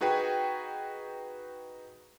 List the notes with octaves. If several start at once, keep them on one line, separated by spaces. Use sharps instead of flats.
D#4 F#4 G#4 B4 G5